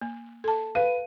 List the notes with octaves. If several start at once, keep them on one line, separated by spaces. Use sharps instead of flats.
A#3
A4 A5
B4 F5 D#7